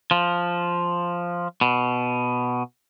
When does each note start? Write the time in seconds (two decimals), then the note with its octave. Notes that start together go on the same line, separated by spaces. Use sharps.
0.11 F3
1.61 B2